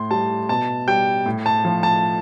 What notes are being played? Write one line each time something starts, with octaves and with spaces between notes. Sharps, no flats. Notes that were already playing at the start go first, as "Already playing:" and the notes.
Already playing: A2 C6
G3 A5
B2 A5
G3 G5
A2
A5
F3
A5